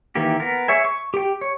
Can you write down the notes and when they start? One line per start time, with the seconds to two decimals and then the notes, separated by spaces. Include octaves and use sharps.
0.15 D#3 E3 A#3 G4
0.40 B3 A#4
0.68 G#4 C#5 E5 G#5
0.85 C#6
1.14 G4 G5
1.41 C#5